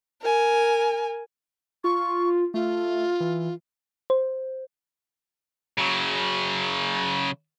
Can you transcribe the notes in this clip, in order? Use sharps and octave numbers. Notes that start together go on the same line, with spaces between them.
A#4 G#5
F4 C#6
A3 F4
E3
C5
C#3 F#3